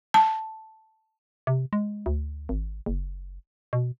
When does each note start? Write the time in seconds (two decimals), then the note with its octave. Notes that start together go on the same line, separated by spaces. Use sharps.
0.14 A5
1.47 C3
1.73 G#3
2.06 D2
2.49 G#1
2.86 F#1
3.73 B2